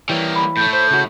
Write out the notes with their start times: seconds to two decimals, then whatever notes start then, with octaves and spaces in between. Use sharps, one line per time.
0.09 E3 G3 A#3 C#5 G5
0.36 B5
0.57 A2 A3 G6
0.73 C5 G6
0.91 C#3 F#4